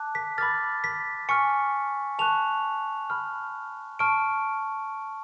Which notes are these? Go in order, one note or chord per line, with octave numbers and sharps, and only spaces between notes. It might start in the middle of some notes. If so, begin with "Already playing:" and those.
Already playing: A5 D6 F#6
B6
B5 D6 F6 A6
B6
G#5 C#6 F6 C#7
A5 C#6 F#6 F7
B5 F6
A5 C#6 F6 D7